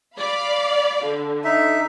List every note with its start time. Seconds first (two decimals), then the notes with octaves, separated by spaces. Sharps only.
0.18 D5 F5 B5
1.06 D3
1.44 D#4 E5